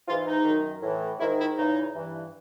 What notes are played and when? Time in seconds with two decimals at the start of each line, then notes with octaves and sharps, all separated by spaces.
0.08 G#2 E3 F4
0.27 D#4
0.45 F#2 D#3
0.82 A2 E3
1.19 G#2 D#3 E4
1.38 E4
1.56 E2 C#3 E3 D#4
1.94 G2 E3